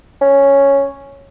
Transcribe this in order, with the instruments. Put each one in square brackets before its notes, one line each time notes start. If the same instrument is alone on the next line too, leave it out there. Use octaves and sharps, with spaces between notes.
[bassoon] C#4